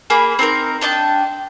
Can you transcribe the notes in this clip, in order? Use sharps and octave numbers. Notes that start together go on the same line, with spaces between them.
A#3 G#4 A#4 B5
C4 D#4 A4 A#4
D4 D#5 G5 A5